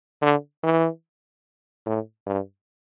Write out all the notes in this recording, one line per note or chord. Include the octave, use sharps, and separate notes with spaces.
D3
E3
A2
G2